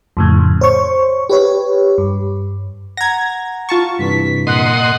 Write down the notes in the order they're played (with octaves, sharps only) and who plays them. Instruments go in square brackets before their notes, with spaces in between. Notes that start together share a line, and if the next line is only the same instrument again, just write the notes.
[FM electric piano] F2 A2 C#3
C5 C#5 C#6
G4 B4 C#5
G2
[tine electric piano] F#5 A#5 [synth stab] G#6 A#6
[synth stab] F4 A5 C#6
[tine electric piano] G2 C3 E3 [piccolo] B6
[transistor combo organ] A#2 D#5 C6 [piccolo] F#5